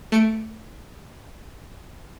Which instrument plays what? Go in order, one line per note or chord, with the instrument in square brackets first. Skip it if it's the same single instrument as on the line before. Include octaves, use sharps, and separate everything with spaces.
[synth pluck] A3 C#7 D7